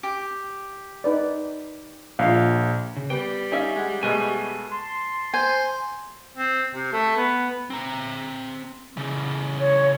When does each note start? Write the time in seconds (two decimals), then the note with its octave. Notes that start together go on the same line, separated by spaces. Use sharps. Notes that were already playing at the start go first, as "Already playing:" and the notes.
0.03 G4
1.04 D#4 B4 D5
2.19 A#1 F4 D#5 F5
2.97 C#3
3.10 G3 B3 G5
3.52 C#4 D#4 E5 F5
3.76 G#3 F#5
4.03 B2 G#3 A3 G#5
4.71 A5 C6
5.34 C5 G#5
6.37 C4
6.74 C3
6.93 A3
7.16 B3
7.70 C4 A#5
8.97 C#3 E3
9.59 C#5